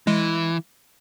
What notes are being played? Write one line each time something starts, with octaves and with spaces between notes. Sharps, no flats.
E3 G#3